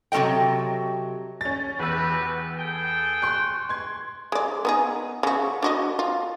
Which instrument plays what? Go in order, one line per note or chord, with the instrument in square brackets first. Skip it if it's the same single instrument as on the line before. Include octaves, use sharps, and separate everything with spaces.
[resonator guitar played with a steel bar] C3 F#3 A3 A4 D#5 G5
[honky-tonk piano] C#4 A6
[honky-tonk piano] E2 E6 [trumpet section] F#4 G4 B4
[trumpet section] G#4 A4 G5
[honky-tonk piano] C6 C#6 F#6
C6 G#6
[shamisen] G#3 D5
B3 D#4 G#4
C#3 F#4
D4 F#4 D#5
F4